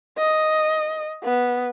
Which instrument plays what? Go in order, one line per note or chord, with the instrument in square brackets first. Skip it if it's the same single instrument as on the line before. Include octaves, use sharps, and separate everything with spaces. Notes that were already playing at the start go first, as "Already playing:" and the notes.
[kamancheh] D#5
B3